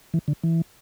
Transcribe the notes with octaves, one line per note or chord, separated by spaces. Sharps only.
E3
D3
E3